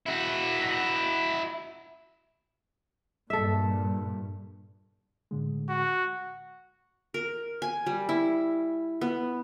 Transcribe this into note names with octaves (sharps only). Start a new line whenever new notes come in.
E4 F#4
G2 A#2 A4 E5
A2 D3 G#3
F#4
A#4
G#5
G3
E4
B3